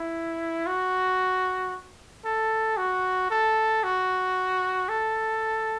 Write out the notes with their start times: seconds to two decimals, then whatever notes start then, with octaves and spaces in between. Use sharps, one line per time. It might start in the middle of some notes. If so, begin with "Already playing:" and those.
Already playing: E4
0.67 F#4
2.25 A4
2.77 F#4
3.31 A4
3.83 F#4
4.89 A4